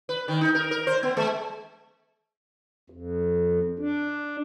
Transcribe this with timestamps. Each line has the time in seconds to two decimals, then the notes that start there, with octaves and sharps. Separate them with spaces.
0.09 B4
0.28 D#3
0.41 D#4
0.55 A#4
0.71 A#4
0.87 C5
1.03 B3
1.17 G#3
2.90 F2
3.79 D4